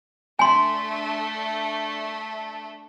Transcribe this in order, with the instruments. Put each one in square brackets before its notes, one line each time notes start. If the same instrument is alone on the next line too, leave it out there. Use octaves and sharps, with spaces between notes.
[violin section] A3 D4 [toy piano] G#5 C6